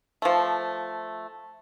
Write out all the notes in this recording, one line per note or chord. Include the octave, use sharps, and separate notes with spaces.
F3 A3